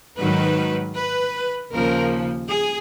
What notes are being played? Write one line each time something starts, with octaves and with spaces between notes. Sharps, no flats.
G#2 D#3 F#3 B4
B4
D#2 C#3 F3 A#4
G#4